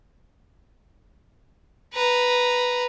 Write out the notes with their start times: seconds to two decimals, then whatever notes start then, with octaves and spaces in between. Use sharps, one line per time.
1.94 B4 A#5